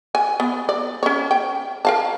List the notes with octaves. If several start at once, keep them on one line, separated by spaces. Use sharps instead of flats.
G#5
B3
D5
C#4 C#5
G5
A#4 F5 A5